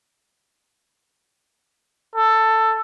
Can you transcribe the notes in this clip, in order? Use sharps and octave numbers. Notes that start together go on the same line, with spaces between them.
A4